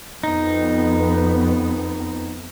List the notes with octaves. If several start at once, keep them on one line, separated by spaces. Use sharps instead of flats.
F2 B3 D#4